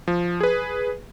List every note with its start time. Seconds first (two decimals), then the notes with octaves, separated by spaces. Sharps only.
0.08 F3
0.40 G#4 B4